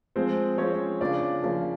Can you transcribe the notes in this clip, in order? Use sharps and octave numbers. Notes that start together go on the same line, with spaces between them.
F3 G#3 C4 C5
F3 G#3 C4 C#4 C#5
C#3 F3 A#3 D4 D5
C#3 F3 A#3